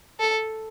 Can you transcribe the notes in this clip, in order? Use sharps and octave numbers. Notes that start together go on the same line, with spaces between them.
A4